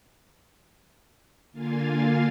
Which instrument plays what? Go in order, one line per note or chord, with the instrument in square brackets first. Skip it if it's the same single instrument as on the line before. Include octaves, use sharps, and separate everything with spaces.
[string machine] D3 A#3 F4 F5 G#5 A6